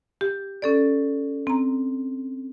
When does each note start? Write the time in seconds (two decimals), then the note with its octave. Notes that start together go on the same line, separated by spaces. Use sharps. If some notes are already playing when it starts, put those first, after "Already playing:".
0.21 G4
0.62 C#4 A4 D5
1.47 C4 A#5